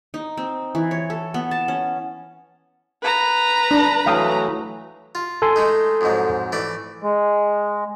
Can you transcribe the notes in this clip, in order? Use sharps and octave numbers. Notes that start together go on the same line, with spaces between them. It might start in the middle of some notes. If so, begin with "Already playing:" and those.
D#4
C4
E3
C#5
A4
B3
A5
C#4
B4 A#5
D4
E3 F#3 A3 F5 G5 D#6
F4
A4 G#5 C6
G#3 A3 D#4
F2 G#2 F#3
E3 A3 D5
G#3